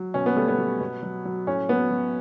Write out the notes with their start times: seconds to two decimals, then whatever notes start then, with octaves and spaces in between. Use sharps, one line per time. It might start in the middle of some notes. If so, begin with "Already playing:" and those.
Already playing: F#3
0.14 B2 C#4
0.26 B3
0.36 G3 A3
0.48 B3
0.58 G3
0.81 B2
1.02 F#3
1.25 F#3
1.47 A2 C#4
1.69 F#3 B3
1.91 F#3